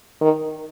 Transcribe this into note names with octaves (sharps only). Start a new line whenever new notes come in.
D#3